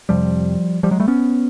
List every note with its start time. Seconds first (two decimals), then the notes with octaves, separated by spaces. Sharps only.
0.09 F2 C3 F3 G3
0.83 F3 G3
0.91 F#3 G#3
1.00 G3 A3
1.08 B3 C#4